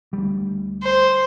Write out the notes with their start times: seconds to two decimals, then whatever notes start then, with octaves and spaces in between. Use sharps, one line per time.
0.13 D2 G3
0.83 C5